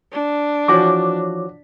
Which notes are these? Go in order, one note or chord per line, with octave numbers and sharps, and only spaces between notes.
D4
E3 F3 F#4 C#5 D6